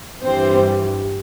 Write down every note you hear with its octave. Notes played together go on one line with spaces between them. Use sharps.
G2 E3 G3 C4 C5